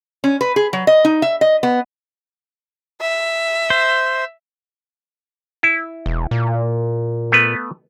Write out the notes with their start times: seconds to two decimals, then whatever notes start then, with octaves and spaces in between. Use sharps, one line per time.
0.24 C#4
0.41 B4
0.56 G#4
0.73 F#3
0.87 D#5
1.05 D#4
1.22 E5
1.41 D#5
1.63 B3
3.01 E5
3.70 C5
5.63 E4
6.06 E1
6.31 A#2
7.32 A3 B3 B4